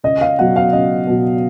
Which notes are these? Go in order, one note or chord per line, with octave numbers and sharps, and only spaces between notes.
C#2 D#5
F5
B2 F#3 F#5
F5
C#2 D#5
B2 F#3